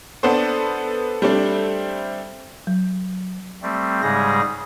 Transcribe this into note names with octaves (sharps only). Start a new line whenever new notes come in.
B3 D4 A4 C5
G3 A3 C4 D4
F#3
G3 A3 C4
G#2 C#3 G3 G#3 G#4 A#6